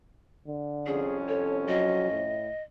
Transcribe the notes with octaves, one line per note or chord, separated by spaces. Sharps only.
D3
C2 F2 C#4 G#4
A4 C#5
F#3 D#5
A2